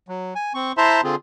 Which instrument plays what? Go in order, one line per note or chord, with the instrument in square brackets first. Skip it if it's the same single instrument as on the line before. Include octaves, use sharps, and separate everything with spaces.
[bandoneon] F#3
G#5
C4 C#6
E4 C5 E5 A5 A#5 C6
D3 C4 F4 G#4